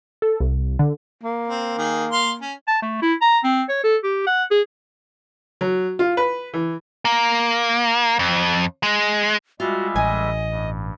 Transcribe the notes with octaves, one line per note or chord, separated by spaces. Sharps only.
A4
C2
D3
A#3
C4
D#3 G#4
F5 C6
C#4
A5
A3
E4
A#5
C4
C#5
A4
G4
F#5
G#4
F#3
F4
B4
E3
A#3
F2
G#3
G3 G#3 F4 F#4 E5
A1 D#5 G#5
G2